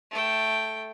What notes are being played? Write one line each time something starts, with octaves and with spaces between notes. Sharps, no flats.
A3 G5